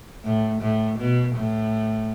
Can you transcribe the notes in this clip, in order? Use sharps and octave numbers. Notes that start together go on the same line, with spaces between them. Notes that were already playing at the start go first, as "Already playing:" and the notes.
A2
A2
B2
A2